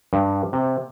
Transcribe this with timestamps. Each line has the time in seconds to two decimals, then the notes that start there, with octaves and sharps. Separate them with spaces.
0.13 G2
0.53 C3